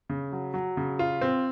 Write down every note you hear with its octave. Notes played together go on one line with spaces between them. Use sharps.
C#3
F#3
F#3
C#3
F4
C4